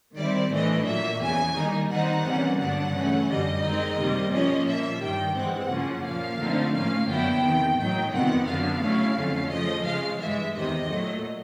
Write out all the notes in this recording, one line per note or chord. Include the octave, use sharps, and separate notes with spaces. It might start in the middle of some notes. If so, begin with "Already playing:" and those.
D#3 G3 C4 E4 D5
A2 E3 A3 D4 D#5
A#2 F#3 A#3 E5
E2 C#3 E3 G#5
D#3 G3 A#3 D#4
D#3 G3 C4 D#4 F#5
C3 E3 G3 A#3 C#4
G2 D3 F#3 B3 D4 F#5
C#3 E3 A3 C#4
F#2 D3 G3 D#5
D#3 G#3 C4 D#4
C3 D#3 G3 A#3
A#2 F3 A#3 C#4 D#5
A#2 F3 A#3 E5
G2 D#3 G3 G5
G2 E3 G#3 C4 F#5
F#2 C#3 F3 A#3 C#4
A#2 F3 A#3 F5
D3 F3 A3 C4 D#4
A2 F3 A#3 C#4 F5
F#2 D3 F#3 B3 E4 G5
E2 C3 D#3
A2 F#3 A#3 D#4 G5
F2 C3 D#3 G3 B3 F#5
F#2 D3 F#3 B3 F5
C#3 F#3 A3 C#4 E4
F2 D3 F#3 A3 C#4
C#3 F3 A3 D#5
C#3 F3 G#3 F5
G2 E3 G#3 E5
E2 C3 D#3 D#5
A#2 F#3 A3